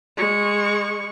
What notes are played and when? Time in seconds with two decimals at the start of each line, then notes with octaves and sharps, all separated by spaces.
0.17 G#3 C#6